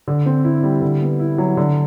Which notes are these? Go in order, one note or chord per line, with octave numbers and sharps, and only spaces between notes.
D3
C4
E4
G3
D3
B3
E4
F#3
D3